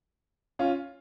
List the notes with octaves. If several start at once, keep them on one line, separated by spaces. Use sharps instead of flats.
C#4 F4